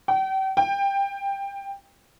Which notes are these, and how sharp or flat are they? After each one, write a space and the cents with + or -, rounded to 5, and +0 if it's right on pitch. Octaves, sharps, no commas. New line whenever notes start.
G5 -35
G5 +15